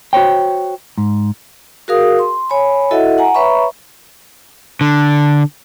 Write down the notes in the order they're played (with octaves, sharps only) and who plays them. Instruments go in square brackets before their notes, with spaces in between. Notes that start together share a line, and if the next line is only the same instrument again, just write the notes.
[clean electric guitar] F#4 C5 C#5 G5
G#2
[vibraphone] F#4 G#4 A#4 F5 D#6
C6
C#5 G#5 B5
E4 F#4 A4 D#5 E5 F#5
F#5 G#5 A#5
B4 C#5 E5 A#5 B5 C#6
[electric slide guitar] D3